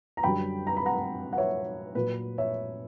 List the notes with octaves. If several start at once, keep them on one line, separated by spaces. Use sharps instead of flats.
A#5
F#2 D3 G3 G5 B5
A#5
B5
F#5 A#5
F#5
C#5 E5
A#2 F#3 B4
C#5 E5